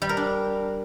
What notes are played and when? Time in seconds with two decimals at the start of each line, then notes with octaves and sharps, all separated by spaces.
0.02 G3
0.09 A#4
0.17 D4